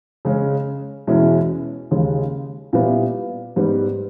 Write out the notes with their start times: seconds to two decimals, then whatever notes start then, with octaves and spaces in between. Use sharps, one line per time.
0.25 C#3 G#3 C#4
1.07 E2 B2 G#3 C#4 E4
1.91 D#2 C#3 G#3
2.73 A#2 G3 B3 E4
3.56 G#2 G3 B3